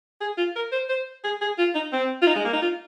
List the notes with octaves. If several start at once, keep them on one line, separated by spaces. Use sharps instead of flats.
G#4
F4
A#4
C5
C5
G#4
G#4
F4
D#4
C4
F4
D#4
G#3
A#3
D#4
F4